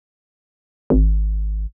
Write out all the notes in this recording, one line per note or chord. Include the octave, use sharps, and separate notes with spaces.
G#1